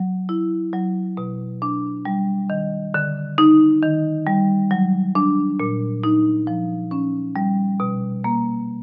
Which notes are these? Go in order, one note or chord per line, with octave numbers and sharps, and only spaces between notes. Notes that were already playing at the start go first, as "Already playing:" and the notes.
Already playing: F#3
E4
F#3
B2
D4
G3
D#3
D3
D#4
D#3
G3
F#3
D4
A#2
D#4
F3
C#4
G3
B2
A#3